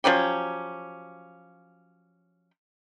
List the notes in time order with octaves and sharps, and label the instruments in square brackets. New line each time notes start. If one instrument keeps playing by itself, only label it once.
[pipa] F3 F#3 C#4 G4